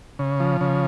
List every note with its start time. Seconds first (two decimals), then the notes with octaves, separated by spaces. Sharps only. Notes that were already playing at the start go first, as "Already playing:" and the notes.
0.19 C#3
0.40 F3
0.61 C#3